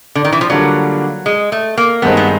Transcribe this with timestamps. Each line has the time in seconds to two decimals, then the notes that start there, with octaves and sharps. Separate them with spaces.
0.15 D3
0.25 D#3
0.32 E3
0.41 F3
0.50 D3 F#3 G3 A#3 D4 F4
1.26 G#3
1.52 A3
1.78 A#3
2.02 G2 D#3 G#3 B3 C4 D#4
2.17 B3